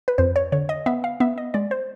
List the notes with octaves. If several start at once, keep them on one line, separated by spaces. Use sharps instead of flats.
B4
F2 C5
C#5
D3 C#5
D#5
B3 E5
F5
B3 E5
D#5
G#3 D5
C5